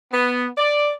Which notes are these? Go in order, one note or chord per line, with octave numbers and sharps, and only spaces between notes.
B3
D5